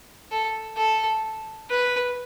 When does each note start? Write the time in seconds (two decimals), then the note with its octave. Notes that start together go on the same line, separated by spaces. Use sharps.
0.32 A4
0.77 A4
1.70 B4